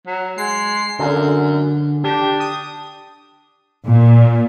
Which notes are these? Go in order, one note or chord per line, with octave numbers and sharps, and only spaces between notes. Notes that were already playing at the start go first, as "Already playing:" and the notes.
F#3
G#3 C7
F#2 D3
D4 G4
D#6
A#2